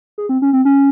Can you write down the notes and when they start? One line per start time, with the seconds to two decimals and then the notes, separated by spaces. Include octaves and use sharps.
0.18 G#4
0.29 C4
0.42 C#4
0.53 C4
0.65 C#4